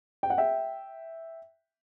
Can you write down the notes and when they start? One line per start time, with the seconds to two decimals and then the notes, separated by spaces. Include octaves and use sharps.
0.23 G5
0.30 F#5
0.38 E5 G5